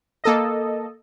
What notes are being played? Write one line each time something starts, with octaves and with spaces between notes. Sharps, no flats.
A#3 A4 D#5